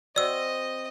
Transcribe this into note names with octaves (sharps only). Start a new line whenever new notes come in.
C4 F#4 D5 D#5 E6